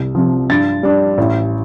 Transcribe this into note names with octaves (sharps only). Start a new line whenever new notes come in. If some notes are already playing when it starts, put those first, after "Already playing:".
Already playing: C2
C3 F3
G2 A6
G3 D4
A1